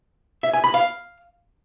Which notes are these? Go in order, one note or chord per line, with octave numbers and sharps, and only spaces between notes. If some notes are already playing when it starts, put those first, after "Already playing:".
E5
G#5
B5
F5